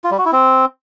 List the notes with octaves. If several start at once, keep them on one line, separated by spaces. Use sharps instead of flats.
F4
G3
F#4
E4
C4